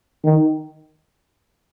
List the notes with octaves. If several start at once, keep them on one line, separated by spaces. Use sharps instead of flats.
D#3